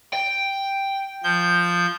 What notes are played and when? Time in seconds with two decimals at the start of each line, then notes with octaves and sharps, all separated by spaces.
0.14 G5
1.23 F3 G6